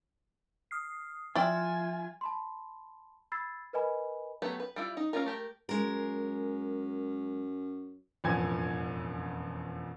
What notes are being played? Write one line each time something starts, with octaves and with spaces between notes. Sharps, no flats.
D#6 F6 C7
F3 E4 F4 D5 E5 G5 G#5 A6
A5 B5 C6
B5 E6 G#6 A6 C7
A#4 B4 D#5 G#5 B5
F#3 A3 B3 G4 B4
B4
G3 E4 F4
D#4
A#3 C4 C#4 F4 A#4
A3 G4 A#4
F#2 G#3 A#4
E1 A1 F2 E3 G#5 G#6